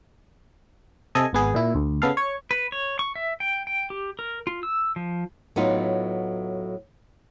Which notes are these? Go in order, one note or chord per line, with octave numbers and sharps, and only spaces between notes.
C3 A4 D#5 G#5
G#1 B3 G#4
A#2 E4
D2
C#3 B3 A4 F5
C#5 C#6
B4
C#5
C#6
E5
G5
G5
G4
A#4
F4
E6
F3
A2 F#3 B3 D#4 F4